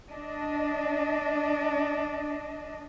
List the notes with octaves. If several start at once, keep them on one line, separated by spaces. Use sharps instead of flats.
D4 D#5